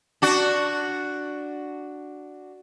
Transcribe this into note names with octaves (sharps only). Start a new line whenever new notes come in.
D4 F#4